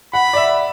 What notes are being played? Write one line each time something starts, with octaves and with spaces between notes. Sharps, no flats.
F#5 B5
D5
E5